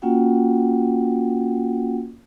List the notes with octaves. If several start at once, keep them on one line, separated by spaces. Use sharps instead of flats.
A#3 C#4 F4 F#4 F#5 G5